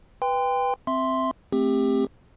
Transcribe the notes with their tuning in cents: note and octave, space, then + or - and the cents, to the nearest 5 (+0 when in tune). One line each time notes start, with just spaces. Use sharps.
B4 +0 G5 +20 C6 -30
C4 +0 E5 +0 C6 +0
A3 +0 C4 +0 G4 +20